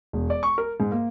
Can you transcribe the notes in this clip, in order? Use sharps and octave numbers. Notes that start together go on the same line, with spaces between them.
E1
D5
C#6
A#4
G#2
A#3